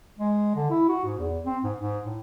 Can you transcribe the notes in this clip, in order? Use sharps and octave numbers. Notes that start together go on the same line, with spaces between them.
G#3
D3
E4
F#4
G#2
E2
C4
G#2
G#2
A2